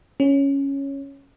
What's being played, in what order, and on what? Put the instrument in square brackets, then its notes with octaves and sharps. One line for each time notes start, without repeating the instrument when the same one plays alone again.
[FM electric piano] C#4